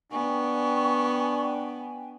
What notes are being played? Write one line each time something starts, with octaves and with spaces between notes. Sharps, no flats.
B3 D4 G5 G#5 C#6